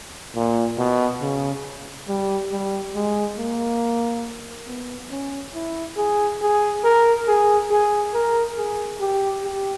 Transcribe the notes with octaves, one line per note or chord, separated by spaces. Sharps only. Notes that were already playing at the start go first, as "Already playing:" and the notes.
A#2
B2
C#3
G3
G3
G#3
A#3
B3
C#4
E4
G#4
G#4
A#4
G#4
G#4
A#4
G#4
G4
G4